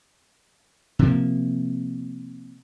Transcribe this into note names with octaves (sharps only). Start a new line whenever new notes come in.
C3 F3 A#3